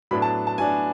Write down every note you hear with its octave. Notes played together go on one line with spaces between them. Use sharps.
A2 F#3 B3 D4 B5
A5
A5
A2 F#3 B3 D4 G#5